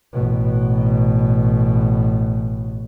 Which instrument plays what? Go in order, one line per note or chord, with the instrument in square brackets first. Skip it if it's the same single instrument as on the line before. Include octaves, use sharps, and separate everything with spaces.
[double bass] A1 B2